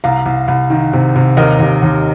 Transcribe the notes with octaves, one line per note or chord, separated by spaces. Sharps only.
C2 F5 A#5
C2
C2
D#3
C3
C3
D#2 A#4 D#5
D#2
D#2